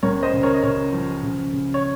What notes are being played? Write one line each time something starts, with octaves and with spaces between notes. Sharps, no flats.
C#2 A#4 C#5
C5 D#5
C#3
A#4 C#5
D#5
C#3 A#4 C#5
F3
C#3
C#3
C#5